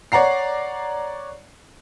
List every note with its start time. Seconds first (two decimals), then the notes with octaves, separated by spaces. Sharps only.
0.12 C#5 D5 F#5 A#5 C7